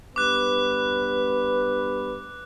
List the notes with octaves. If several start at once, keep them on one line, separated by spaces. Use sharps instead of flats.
G2 B3 B4 D6 F#6